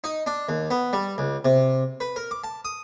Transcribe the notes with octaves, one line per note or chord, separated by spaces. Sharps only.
D#4
D4
D#2
B3
G3
C#2
C3
B4
A#4
D6
A5
D#6